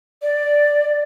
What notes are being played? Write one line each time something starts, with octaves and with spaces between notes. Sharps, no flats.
D5